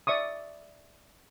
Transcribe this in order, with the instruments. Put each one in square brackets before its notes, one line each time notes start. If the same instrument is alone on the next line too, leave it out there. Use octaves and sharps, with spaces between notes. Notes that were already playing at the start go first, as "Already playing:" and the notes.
[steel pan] D5 E5 C#6 D#6